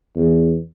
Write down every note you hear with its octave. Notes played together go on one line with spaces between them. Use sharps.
E2